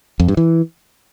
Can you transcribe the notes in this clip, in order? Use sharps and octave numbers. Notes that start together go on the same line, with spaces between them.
F2
G2
E3